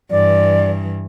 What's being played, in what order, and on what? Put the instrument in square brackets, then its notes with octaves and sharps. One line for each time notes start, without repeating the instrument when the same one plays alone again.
[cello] G2 E3 [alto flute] D5